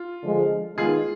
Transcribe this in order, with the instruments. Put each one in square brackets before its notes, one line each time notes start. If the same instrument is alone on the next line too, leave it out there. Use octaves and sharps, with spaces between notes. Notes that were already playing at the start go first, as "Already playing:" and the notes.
Already playing: [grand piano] F4
[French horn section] D3 F3 G#3
[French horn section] D#3 G#3 B3 D#4 [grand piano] F4 G#4